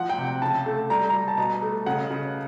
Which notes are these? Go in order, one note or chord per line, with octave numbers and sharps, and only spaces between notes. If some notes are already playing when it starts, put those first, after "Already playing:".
Already playing: F3 F#5
G5
C3
G5
C#3 A5
A3
G3 A#5
G3 A#5
A5
B2 A#5
A3
C#3 F#5
C#3